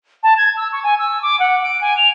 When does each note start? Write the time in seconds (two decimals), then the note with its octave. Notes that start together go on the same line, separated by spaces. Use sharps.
0.23 A5
0.38 G#6
0.57 E6
0.72 C#6
0.84 G#5
0.99 E6
1.22 D6
1.40 F#5
1.63 D7
1.81 G#5
1.97 F7